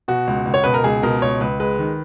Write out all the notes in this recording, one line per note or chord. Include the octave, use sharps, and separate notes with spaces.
B2 F#4
C#2
C#2
C#5
B2 B4
A#4
C#2 G#4
B2 A#4
C#2 C#5
C#2 B4
G#3 B4
D#3